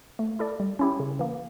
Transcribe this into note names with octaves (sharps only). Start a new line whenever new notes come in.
A3
E4 A4 D5
G3
C#4 E4 G4
C#3
E3 A#3